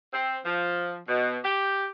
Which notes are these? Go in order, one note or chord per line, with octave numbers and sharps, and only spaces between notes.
C4
F3
B2
G4